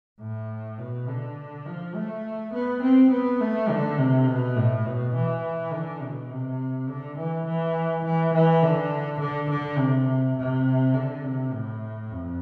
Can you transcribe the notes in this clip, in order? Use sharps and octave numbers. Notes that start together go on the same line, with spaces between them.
A2
B2
D3
F3
A3
B3
C4
B3
A3
D3
C3
B2
A2
B2
E3
D3
B2
C3
D3
E3
E3
E3
E3
D3
D3
D3
C3
C3
D3
C3
A2
F2